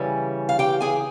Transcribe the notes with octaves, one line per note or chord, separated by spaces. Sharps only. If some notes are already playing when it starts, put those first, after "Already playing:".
Already playing: C#3 E3 G3 C#4
F5
G4 G5
G#4 G#5